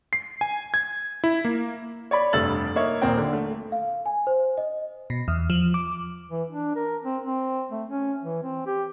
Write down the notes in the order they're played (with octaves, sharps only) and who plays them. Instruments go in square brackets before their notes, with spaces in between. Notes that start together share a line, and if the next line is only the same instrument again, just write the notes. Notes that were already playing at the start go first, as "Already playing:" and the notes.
[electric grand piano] C7
G#5
G#6
E4
A#3
[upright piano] C#5 D5 B5
F1 G2 A3 E6 A6 F#7
A#3 D#4 C#5 E5
D#1 A#2 A#3 C4 G5
D3
A3
[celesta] F5
G#5
C5
D#5
[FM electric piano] B2
E2
F3
D6
[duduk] E3
D4
A#4
C4
C4
A3
C#4
E3
C4
G4